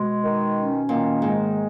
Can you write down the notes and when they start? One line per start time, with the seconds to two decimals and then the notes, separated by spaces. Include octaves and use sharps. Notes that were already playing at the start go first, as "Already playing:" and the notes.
Already playing: B2 G#3
0.24 D#3
0.56 C#4
0.89 A#2 D#3
1.22 G#2 G#3